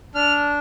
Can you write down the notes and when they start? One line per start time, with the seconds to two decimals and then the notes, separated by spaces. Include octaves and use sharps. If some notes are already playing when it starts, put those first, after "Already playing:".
0.15 D4 F6